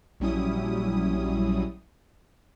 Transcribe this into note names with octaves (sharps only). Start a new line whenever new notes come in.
A#1 F#3 G3 C#4 E4 D#6